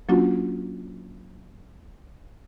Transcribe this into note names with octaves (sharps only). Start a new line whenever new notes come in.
F#3 A#3 C#4 D4 F4 F#4